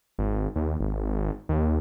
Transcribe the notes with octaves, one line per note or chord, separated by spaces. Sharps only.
G#1
D#2
G#1
D#2